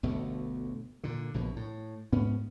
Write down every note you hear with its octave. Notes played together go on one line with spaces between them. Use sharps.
G1 D2 B2 A3
A#2 D3
A#1 B2
A2
G#2 B3 C#4